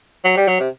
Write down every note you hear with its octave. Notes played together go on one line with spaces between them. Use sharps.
F#3
G3
F#3
C3